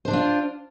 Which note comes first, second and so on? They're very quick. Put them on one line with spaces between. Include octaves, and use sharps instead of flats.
C5 D4 D5 F4